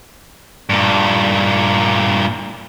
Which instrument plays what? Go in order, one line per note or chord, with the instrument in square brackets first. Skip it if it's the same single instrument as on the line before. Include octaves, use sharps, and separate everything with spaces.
[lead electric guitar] G2 A#2